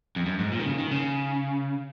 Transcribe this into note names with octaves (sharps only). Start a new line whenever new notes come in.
F2
F#2
G#2
A#2
D#3
C#3
D#3
C#3